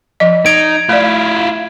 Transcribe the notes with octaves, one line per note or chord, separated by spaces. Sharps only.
F3 D#5
D#4 G#6 D7
A3 E4 F4 D5